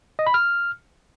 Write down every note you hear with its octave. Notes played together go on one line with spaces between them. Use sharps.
D#5
B5
F6